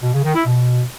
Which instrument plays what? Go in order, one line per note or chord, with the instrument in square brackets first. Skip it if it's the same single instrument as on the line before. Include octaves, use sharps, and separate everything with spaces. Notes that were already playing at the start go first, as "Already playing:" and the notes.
[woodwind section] B2
C#3
D#3
E4
B2